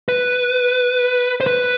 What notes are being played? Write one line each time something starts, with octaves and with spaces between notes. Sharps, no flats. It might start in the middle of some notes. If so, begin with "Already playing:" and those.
B4
C5
B4